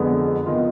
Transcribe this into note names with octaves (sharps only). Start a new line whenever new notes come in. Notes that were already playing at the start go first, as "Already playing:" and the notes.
Already playing: F2 D3 G#3 B3
D#3 B3 F4